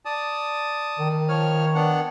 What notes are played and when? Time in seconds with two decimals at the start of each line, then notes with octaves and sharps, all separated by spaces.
0.05 D5 A5 D#6
0.99 D#3
1.29 F3 C#5 F6
1.75 B3 D4 F#5